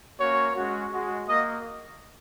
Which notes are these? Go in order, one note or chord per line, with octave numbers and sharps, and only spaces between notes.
A#3 C#4 F#4 C#5
G#3 C#4 F#4
G#3 F#4
A#3 F#4 D#5